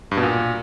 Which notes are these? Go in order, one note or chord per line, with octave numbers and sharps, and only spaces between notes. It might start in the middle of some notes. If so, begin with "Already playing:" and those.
G2
B2
A#2